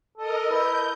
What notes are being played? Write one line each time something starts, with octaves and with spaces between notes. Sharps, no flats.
A4 A#4 D#5
E4 B4 D#5 G6